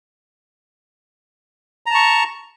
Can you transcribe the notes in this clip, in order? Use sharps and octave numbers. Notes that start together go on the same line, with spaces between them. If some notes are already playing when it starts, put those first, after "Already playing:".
A5 A#5 C#6